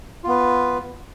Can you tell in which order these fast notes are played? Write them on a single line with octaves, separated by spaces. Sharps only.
F4 B3 B4